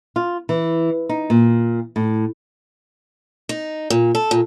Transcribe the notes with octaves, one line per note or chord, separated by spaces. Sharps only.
F4
E3
D#4
A#2
A2
D#4
A#2
A4
A#2